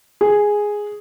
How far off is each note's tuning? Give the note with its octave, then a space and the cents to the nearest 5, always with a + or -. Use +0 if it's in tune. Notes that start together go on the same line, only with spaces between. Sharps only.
G#4 +0